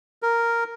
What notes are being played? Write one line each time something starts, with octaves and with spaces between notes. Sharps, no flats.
A#4